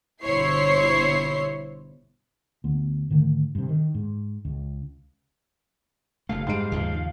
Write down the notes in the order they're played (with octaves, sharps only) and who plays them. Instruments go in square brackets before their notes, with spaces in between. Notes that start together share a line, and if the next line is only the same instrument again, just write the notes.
[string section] G1 B2 E4 C5 C#5 C7
[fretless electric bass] D2 B3
G#2 D3 D#3 A3
G2 C3
D#3
G#2
C#2
[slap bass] F#1 C#3 A3 [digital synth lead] F5
[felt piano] G#2 D7 [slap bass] G3
[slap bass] D#2 C#3 F3